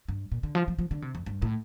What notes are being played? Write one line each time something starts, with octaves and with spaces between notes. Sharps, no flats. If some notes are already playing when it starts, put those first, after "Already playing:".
G2
A#2
D3
F3
F3
F3
D3
C3
F2
G2
A2